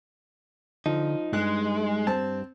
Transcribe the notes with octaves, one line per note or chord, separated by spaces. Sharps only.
D3 F3 D#4
G2 G#3 F#6
C4 A5